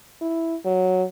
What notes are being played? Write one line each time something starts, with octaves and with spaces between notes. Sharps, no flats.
E4
F#3